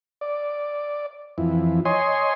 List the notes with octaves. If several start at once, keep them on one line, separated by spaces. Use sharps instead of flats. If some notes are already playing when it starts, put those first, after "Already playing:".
D5
F2 E3
C#5 D#5 G#5 C6